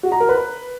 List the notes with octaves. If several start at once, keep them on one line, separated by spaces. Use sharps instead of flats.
F#4
A#5
A#4
B4